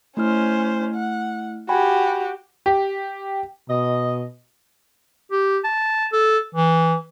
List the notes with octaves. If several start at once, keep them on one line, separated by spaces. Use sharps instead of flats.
A3 C#4 E4 C5 F6
F#5
F#4 G4 G5 G#5 B5
G4
B2 D#5
G4
A5
A4
E3